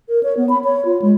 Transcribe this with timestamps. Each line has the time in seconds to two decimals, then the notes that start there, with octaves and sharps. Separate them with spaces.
0.09 A#4
0.23 C#5
0.37 B3
0.49 B5
0.64 C#5
0.85 F4
1.02 G#3